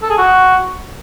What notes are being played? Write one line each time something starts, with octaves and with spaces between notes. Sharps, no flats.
A4
G#4
F#4